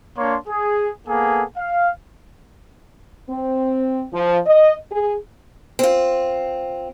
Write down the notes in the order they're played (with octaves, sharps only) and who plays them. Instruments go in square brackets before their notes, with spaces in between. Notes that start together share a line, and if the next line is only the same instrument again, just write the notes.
[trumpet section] A#3 D4 C#5 C6
G#4
A#3 B3 G#4 A4 G#5
F5
[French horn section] C4
F3
D#5
G#4
[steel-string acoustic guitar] C4 F4